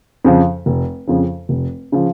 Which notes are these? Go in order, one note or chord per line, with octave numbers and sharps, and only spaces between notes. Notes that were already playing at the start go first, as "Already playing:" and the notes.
F2 C#3 F3
F1
F2 C#3 F3
F1
C#3 F3